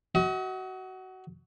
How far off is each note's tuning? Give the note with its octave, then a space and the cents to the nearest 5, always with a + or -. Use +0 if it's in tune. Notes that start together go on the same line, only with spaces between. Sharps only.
F#4 +20 D#5 +45